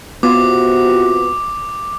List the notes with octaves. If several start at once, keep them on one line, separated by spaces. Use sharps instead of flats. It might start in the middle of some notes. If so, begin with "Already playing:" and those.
C3 B3 F4 F#4 D6